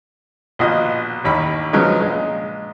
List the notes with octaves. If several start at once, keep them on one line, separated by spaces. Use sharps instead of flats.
A#1 B2 F4 D#5
A1 D#2 B5
C#3 F3 F#3 G#3 B3
A#1 G#3